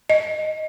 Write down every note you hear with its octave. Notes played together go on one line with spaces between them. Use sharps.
D#5